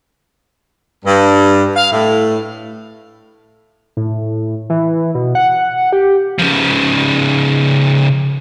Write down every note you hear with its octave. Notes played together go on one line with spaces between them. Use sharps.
G2
F5
A2
A2
E3
B2
F#5
G4
C#3 F3